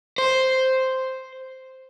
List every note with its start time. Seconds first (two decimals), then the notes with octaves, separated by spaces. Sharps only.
0.18 C5